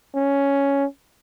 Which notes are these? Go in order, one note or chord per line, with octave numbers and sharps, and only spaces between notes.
C#4